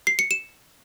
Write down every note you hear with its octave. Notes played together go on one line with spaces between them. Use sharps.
C7
C#7
E7